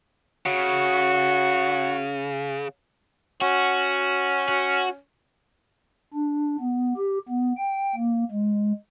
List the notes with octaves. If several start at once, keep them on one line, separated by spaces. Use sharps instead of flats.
C#3 F#4
C#4 F#4
F#4
D4
B3
G4
B3
G5
A#3
G#3